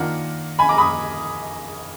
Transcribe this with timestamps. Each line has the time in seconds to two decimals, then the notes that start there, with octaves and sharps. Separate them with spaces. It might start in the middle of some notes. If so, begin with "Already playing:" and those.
Already playing: D#3 A#3 D4 F4 F#5 A#5
0.59 G#5 B5
0.69 A#5 D6
0.78 B5 D#6